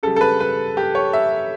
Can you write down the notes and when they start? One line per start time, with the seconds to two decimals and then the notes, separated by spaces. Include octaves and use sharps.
0.03 C#3 G3 A4
0.16 A4
0.21 B4
0.40 B4
0.77 G4
0.95 C#5
1.13 E5